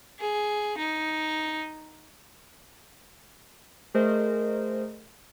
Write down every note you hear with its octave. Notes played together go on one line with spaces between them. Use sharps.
G#4
D#4
A3 G#4 A#4 C5 D#5